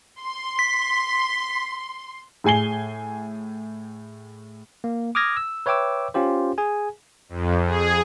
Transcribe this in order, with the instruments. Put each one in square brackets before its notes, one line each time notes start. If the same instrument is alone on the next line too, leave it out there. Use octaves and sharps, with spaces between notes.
[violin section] C6
[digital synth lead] B6
[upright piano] A2 G#4 G#5 C7 G7
[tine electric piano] A#3
D6 D#6 F6 G#6 A#6
E6
B4 C#5 E5 G5 D6 E6
C#4 F4 G4 C5
G#4 G#5
[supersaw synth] F2
G#4